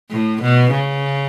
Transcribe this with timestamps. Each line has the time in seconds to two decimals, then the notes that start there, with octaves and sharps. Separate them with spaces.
0.11 A2
0.41 B2
0.72 C#3